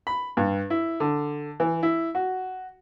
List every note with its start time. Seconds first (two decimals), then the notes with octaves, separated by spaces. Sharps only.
0.07 B5
0.37 G2
0.70 E4
1.00 D3
1.60 E3
1.83 E4
2.15 F#4